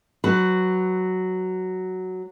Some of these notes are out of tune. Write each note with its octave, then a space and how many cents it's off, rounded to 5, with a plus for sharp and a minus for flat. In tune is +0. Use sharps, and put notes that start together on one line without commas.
F#3 +0 B4 +10